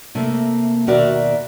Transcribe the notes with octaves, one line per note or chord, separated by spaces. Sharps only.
C3 A3 A#3
D#2 B2 F#4 A#4 D5 E5